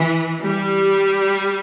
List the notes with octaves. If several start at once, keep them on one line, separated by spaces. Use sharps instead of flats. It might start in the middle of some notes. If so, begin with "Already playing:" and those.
Already playing: E3
G3